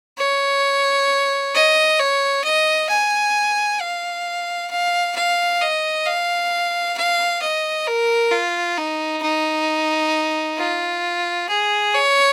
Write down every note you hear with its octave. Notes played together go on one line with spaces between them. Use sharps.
C#5
D#5
C#5
D#5
G#5
F5
F5
F5
D#5
F5
F5
D#5
A#4
F4
D#4
D#4
F4
G#4
C#5